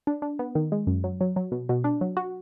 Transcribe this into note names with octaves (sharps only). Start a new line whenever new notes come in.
D4
D4
B3
D#3
G#3
F#2
F#3
F#3
F#3
B2
B2
D4
F#3
F#4